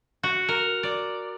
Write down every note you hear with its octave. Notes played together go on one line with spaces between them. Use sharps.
F#4
A#4
D5